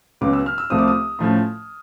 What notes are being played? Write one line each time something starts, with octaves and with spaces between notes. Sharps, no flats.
C#2 C#3 F#3 B3 D6
E6
F6
E6
C2 C3 F3 A3 C4 D#6
D6
D#6
A2 F3 A3 C#4